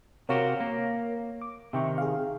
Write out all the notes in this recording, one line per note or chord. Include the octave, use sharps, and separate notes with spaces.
C3 F#4 G4 A#4 C#5 F5
A#3
D6
C3 D#3 E5 G5 C#6
G#4 F5